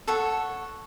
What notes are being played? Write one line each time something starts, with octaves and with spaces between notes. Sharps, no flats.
A4 C#5 F#5